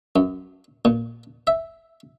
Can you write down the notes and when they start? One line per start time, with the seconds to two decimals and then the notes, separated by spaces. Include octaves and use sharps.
0.16 F#2
0.85 A#2
1.47 E5